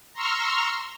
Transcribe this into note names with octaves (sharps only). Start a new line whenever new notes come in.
A#5 C6 C#6 E6 F6